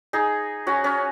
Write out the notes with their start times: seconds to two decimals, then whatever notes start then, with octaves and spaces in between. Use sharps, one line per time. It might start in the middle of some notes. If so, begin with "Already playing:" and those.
0.13 D#4 G#4
0.67 C#4 F#4
0.84 C#4